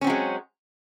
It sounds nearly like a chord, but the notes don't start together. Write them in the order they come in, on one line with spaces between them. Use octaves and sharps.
C#4 C4 F#3 G#3